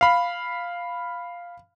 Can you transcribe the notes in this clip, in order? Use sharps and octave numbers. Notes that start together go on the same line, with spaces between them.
F5 B5